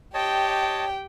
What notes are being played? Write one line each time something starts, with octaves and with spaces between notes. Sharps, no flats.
G4 C#5 D#5 G5 A5